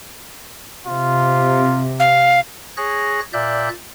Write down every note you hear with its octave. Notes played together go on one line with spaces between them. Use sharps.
C3 F4
F5
G#4 C#5 F#6 A#6
A#2 D5 E5 F#6 G6